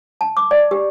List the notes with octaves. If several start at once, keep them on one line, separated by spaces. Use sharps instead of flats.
A5
D6
D5
G4